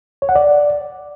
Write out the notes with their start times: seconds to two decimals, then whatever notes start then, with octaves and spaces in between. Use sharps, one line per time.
0.22 C#5
0.29 F#5
0.35 D5